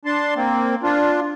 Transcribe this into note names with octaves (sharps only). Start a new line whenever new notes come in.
D4 A5 C6
A#3 C4
D4 F4